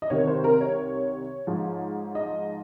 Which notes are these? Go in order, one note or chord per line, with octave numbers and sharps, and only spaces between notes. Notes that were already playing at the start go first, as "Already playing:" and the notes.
D#5
C2 C3 D#3 C#5
C5
A#4
C#5
G#2 F3
D#5